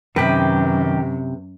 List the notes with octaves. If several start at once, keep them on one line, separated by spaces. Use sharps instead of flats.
F#2 C3 D#3 G4 B4